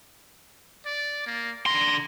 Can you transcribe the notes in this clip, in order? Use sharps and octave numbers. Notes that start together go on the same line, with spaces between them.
D5
A#3
D3 A#5 C6